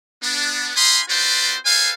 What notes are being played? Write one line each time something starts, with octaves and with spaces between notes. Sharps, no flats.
B3 D4
D#4 F5 G#5 B5 C6 D#6
C4 F4 F#4 B4 C5 D5
G#4 A4 B4 C5 F5 G#5